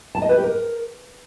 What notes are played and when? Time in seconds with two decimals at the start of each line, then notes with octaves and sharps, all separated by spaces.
0.15 A5
0.22 D#5
0.29 B4
0.36 G4
0.43 A#4